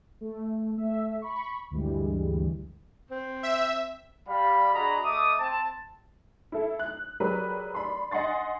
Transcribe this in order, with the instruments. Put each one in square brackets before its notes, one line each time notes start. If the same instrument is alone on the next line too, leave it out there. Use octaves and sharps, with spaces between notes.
[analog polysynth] A3
A3 E5
B5 C#6
D2 G2 E3 G3 G#3
[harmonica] C4
[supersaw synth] E5
[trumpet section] G3 F5 B5
D4 F#4 G#4 D#5 A#5 B5
A3 D#5 E5 D6 D#6
C4 A5
[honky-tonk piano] E4 A4
F#6
F#3 G#3 G4 A#4 B4 D5
D5 B5 C6
D#5 F#5 G#5 C6 A6